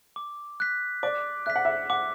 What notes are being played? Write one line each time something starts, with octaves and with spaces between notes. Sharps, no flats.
D6
F#6 B6
D5 D6
E5 F#6 B6
F#5
E5
F#5 D6